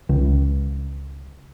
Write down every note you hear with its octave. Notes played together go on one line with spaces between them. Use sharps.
C#2